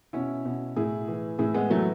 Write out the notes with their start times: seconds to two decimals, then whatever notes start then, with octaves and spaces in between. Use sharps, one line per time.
0.13 B2 C#4 E4
0.45 B2
0.76 A2 E4 G#4
1.08 E3
1.39 A2 E4 G#4
1.54 G#3 B3
1.70 E3 F#3 A3